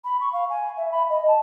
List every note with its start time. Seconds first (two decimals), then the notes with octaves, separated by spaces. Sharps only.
0.05 B5
0.21 C#6
0.33 F5
0.50 G#5
0.77 E5
0.92 B5
1.10 D#5
1.28 A5